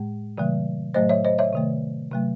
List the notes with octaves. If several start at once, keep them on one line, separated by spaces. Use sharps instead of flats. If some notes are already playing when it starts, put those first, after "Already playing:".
Already playing: A2 G#3
C3 D#3 F#3 A3
A2 F#3 A3 C5 D#5
C#5 E5
C5 D#5
C#5 E5
C3 D#3 A3
C3 F#3 A3